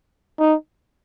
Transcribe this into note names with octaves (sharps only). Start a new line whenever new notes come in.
D#4